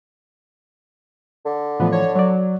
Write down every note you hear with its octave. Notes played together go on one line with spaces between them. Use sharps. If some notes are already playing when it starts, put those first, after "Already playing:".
D3
A2 E3 F3 B3
C#5
F#3 C#5 D5